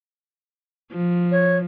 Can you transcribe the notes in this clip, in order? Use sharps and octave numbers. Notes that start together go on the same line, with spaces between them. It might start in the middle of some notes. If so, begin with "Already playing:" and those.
F3
C#5